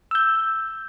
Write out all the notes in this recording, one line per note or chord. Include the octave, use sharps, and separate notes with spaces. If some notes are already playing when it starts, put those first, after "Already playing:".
E6 G6